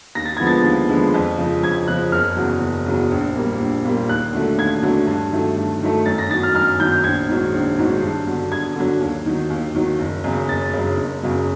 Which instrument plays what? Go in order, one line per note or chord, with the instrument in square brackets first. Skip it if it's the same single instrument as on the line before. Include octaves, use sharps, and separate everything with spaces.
[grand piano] D#2 A#6
A6
D3 F3 G#3 B3 G#6
A6
D#2
D3 F3 G#3 B3
F2
C#3 F3
F2 G#6
C#3 F3 F#6
F#1 F6
E2 C#3 F#3
F#1
E2 C#3 F#3
A#1
A#2 G3 A#3
A#1
A#2 G3 A#3
D#2 F#6
D3 F#3 A3
D#2 G#6
D3 F#3 A3
G2
D#3 F#3 A3
G2
D#3 F#3 A3
F#2 A6
A#6
D#3 A6
F#3
F6
F#2 F6
D#3 F#3 G6
A#1 G#6
G#2 D#3 F#3
A#1
G#2 D#3 F#3
G2
D3 F#3
G2 G#6
D3 F#3
D#2
D#3 F#3
D#2
D#3 F#3
F#1
F#2 C#3
F#1 A6
F#2 C#3
F#1
F#2 C#3 F#3